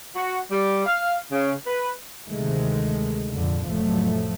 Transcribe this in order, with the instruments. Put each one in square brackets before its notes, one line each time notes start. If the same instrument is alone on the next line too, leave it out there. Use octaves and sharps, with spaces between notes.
[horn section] F#4
G3
F5
C#3
B4
[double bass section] D2 C3 D#3 G#3 A3
F2 A#2 D3
F1 A2 F3 F#3 A3